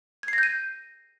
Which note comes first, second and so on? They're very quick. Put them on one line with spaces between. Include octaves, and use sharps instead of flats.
G#6 C7 A#6 G6 D#7